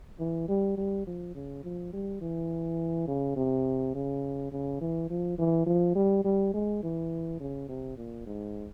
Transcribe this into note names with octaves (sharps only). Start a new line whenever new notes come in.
E3
G3
G3
F3
C#3
F3
G3
E3
C#3
C3
C#3
C#3
E3
F3
E3
F3
G3
G3
G#3
E3
C#3
C3
A#2
G#2